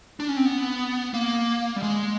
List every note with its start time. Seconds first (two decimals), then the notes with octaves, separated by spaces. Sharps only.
0.20 D4
0.28 C#4
0.37 C4
0.46 B3
1.14 A#3
1.76 G3
1.83 G#3